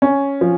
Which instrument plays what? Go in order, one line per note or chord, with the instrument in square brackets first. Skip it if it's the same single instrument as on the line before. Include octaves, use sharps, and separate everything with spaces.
[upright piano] C#4
F3